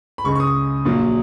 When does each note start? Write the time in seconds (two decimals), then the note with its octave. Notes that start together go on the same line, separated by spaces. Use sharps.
0.18 B5
0.24 C#2 C#3 G#3 C#6
0.35 C#6
0.40 D#6
0.85 A#1 A#2 F#3